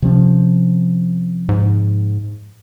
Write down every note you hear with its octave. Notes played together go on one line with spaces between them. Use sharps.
C3 F3 C#4
G#2